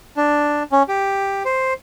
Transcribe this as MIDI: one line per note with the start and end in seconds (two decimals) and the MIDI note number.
0.17 0.63 62
0.72 0.83 61
0.88 1.43 67
1.45 1.73 72